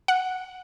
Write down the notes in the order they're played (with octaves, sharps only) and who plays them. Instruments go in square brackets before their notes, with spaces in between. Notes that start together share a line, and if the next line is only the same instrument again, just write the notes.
[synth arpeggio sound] F#5